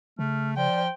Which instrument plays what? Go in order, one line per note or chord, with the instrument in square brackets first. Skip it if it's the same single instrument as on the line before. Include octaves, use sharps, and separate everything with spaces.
[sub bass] C#3 [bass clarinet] A3 [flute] F6
[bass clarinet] F3 [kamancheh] C5 G5 [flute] D5